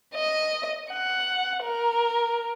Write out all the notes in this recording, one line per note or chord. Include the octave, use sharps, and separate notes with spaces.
D#5
F#5
A#4